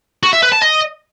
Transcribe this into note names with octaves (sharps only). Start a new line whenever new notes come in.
F#4
E5
B4
A5
D#5